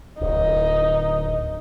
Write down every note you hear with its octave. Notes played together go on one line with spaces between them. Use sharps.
D1 D#4